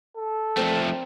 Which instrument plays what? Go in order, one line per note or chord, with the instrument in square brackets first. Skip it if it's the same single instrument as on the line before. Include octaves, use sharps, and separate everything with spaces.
[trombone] A4
[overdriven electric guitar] F3 A3 [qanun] C4 A#4 D5